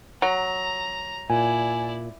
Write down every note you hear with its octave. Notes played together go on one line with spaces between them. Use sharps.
F#3 A#5
A#2 E4 D5 G#5